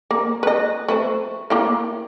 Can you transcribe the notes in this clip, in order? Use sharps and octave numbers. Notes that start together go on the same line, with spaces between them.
A#3
B4 D#5
A3 B4 C5
A#3 E4 F5